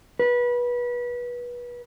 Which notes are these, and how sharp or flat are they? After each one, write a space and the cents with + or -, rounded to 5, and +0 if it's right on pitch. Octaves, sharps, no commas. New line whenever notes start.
B4 -25